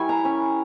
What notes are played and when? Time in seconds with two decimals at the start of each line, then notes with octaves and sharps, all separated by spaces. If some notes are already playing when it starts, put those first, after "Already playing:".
Already playing: G3 E4 A#4 C#5 G#5
0.09 A#5
0.25 C#4